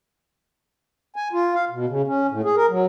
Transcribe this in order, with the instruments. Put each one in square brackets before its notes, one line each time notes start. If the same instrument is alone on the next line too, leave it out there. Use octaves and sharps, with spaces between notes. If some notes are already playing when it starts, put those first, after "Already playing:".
[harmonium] G#5
F4
F5
B2
C#3
C#4
A2
G#4
A#4
F#3